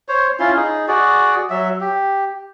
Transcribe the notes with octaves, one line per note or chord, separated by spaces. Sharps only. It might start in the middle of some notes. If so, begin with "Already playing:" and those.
C5 C#5
C#4 E4 F4 C6
D#4 G#4
F#4 G#4 D5
F#3 E5
G4